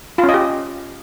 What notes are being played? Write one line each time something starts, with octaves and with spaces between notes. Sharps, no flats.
F4
C#4
D#5
G4